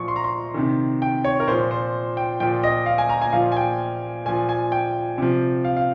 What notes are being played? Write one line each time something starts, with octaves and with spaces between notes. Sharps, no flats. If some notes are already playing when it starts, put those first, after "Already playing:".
Already playing: A#2 F3 C#6
C6
A#5
C6
C3 D#3
G5
C#5
A#4
A#2 F3 C5
C5
G5
A#2 F3 G5
D#5
F5
G#5
A#5
G#5
A#2 F3 F5
G#5
G5
A#2 F3 G#5
G#5
G5
C3 F3
F5
F5